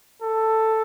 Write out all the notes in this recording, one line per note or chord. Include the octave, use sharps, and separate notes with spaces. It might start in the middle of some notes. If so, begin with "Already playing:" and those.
A4